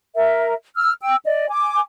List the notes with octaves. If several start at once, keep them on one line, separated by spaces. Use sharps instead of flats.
A#4 E5
E6 F6
G5 E6
D5 D#5
G#5 D6